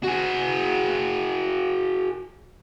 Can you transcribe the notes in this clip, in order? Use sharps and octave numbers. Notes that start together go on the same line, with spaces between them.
F#4 G#4